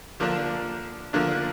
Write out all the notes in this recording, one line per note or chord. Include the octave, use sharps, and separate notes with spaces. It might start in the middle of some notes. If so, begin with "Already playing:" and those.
D3 F3 A#3 D4
D3 F3 A#3 D4